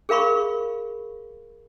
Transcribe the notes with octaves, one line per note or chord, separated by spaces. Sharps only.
G#4 A#4 F5 B5 C#6